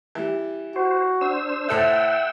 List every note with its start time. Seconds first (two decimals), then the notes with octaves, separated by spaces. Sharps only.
0.15 E3 G3
0.76 F#4 C5
1.21 D4 C5 E6
1.69 A2 A4 C5 E5 F#5 G5 E6